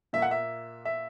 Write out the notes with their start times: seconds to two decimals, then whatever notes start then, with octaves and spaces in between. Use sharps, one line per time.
0.13 A#2 A#3 E5
0.22 F#5
0.31 E5
0.85 E5